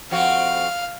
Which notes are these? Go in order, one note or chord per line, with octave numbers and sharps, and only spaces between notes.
F2 C4 F#4 F5